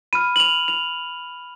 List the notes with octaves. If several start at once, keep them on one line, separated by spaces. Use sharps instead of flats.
B5 F6 D#7
F#7
F7
F7